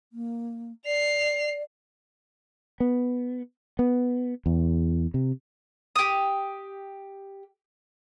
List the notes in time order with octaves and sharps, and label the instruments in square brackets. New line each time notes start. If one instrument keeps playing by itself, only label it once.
[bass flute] A#3
[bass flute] D5 [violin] C7 F7
[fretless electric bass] B3
B3
E2
C3
[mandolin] G4 D#6